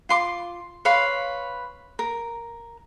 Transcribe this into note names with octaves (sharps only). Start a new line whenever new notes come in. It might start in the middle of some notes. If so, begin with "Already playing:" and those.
F4 C6 D6
B4 C#5 F5 C6
A#4